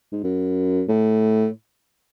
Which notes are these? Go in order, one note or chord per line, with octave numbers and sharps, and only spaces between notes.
G#2
F#2
A2